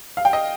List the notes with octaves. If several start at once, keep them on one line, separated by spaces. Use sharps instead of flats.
F5
G5
D#5